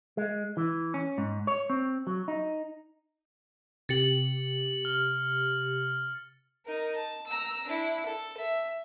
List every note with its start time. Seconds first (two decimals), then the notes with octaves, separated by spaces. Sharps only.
0.17 G#3
0.57 E3
0.94 C#4
1.18 G#2
1.47 C#5
1.70 C4
2.07 F#3
2.28 D#4
3.89 C3 G4 A6 C#7 F#7
4.85 F6
6.65 D#4 A#4
6.96 A5
7.27 A#5 E6
7.67 D4 E4
8.06 A4
8.37 E5